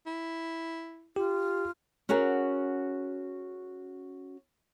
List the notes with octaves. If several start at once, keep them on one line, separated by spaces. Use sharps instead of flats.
E4
F4 G4
C#4 F#4 G#4 A#4 F#5